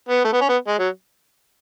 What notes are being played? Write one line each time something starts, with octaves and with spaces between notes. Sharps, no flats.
B3
A3
B3
C#4
B3
G#3
F#3